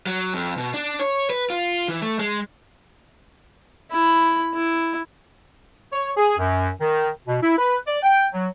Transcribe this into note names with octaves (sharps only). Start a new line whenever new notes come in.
F#3
F2
B2
D4
C#5
B4
F4
E3
A3
G#3
E4 B5
E4
C#5
G#4
F#2
D#3
B2
E4
B4
D5
G5
F#3